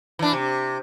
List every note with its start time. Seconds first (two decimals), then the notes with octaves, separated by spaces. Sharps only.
0.19 E3 D4
0.33 C3